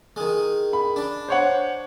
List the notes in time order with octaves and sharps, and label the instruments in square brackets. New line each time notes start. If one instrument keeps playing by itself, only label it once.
[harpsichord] D#3 G#3
[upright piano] B5
[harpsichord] D4
[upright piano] C5 C#5 F#5